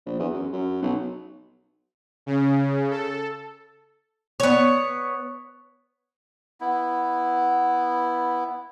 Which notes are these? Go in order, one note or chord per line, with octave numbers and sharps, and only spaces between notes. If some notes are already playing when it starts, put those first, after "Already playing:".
A#1
E2
F#2
F#2
B1
C#3
A4
B3 C#5
B3 E4